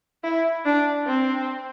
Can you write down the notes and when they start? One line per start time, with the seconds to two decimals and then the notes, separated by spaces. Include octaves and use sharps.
0.24 E4
0.65 D4
1.07 C4